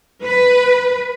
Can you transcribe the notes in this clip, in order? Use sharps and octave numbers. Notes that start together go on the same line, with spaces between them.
B4